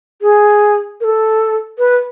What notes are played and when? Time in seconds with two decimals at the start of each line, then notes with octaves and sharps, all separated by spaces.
0.22 G#4
1.01 A#4
1.04 A4
1.78 B4